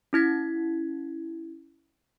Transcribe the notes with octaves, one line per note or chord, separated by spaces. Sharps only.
C#4 E4 G#6 B6